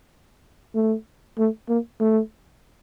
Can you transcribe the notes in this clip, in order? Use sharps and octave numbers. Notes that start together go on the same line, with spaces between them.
A3
A3
A#3
A3